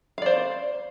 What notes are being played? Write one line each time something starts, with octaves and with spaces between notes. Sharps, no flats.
C5 D5 F5